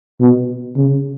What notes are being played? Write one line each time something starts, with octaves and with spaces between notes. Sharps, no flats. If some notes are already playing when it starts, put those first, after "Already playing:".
B2
C#3